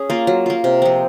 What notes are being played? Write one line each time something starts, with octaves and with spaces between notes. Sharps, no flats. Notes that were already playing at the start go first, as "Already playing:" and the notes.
Already playing: C#4 G#4
A#3 F4
F#3
A#3 F4
C3
F3 C4